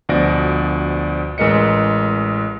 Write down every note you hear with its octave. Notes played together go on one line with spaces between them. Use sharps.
D2 B2 F3 D5 A#6 D7
A1 G#3 A#4 B4 D#5 C#7